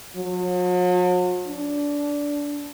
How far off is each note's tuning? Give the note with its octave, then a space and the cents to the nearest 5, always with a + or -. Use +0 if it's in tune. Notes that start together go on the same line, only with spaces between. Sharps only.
F#3 -45
D4 -20